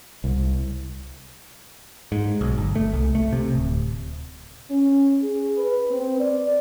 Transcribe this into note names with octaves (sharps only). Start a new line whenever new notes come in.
C2
G#2
B1
G1
A3
C2
A3
C3
D1
C#4
G#4
B4
C4
D5